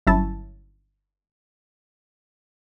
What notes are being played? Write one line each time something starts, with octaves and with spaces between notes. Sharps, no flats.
G1 F#3 C#4 E4 A5